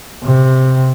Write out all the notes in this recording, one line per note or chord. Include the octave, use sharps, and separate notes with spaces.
C3